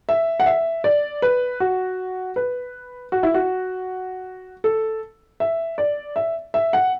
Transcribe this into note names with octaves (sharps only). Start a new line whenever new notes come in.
E5
F#5
E5
D5
B4
F#4
B4
F#4
E4
F#4
A4
E5
D5
E5
E5
F#5